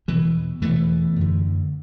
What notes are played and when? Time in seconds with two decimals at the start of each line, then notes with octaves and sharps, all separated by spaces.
0.08 E2 B2 E3
0.62 E2 B2 E3 A3
1.16 F#2 D3